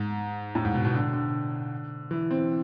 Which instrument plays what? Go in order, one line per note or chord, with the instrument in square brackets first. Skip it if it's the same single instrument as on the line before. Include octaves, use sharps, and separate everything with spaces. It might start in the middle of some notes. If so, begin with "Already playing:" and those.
Already playing: [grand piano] G#2
A2
G#2
B2
B2
D3
D3
E3
C4